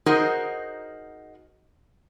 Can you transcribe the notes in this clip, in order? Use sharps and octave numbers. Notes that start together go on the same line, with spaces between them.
D#4 F#4 G#4 A#4 C5 D#5